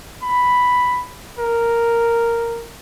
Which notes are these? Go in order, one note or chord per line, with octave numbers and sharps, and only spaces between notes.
B5
A#4